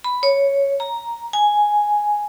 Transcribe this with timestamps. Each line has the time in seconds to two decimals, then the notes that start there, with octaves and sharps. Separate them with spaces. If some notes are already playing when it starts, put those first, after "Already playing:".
0.04 B5
0.23 C#5
0.80 A#5
1.33 G#5